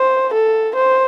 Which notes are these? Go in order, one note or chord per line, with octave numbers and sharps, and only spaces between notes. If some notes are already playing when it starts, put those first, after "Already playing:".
Already playing: C5
A4
C5